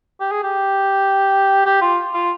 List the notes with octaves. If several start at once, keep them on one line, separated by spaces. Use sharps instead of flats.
G4
G#4
G4
G4
F4
F4